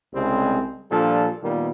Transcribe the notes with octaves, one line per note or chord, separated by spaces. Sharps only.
C2 C#3 G3 G#3 C4
A#2 F3 G3 D4 A4
A#2 D#3 G3 A#3 B3